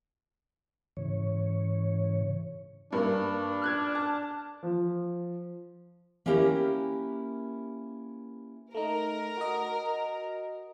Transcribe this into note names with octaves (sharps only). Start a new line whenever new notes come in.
G#2 C#3 E3 C#5
G2 A#3 D4
F6 F#6 G#6
A5
F3
A#3 C#4 E4 G4 A#4 B4
A3 D#4 A#4
F#4 D#5